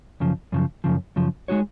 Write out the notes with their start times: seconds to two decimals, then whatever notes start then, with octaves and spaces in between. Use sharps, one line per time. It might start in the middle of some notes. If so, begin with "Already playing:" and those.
0.20 F#2 C#3 F3
0.52 F#2 C#3 F3
0.84 F#2 C#3 F3
1.16 F#2 C#3 F3
1.48 G#3 D#4 F#4 C#5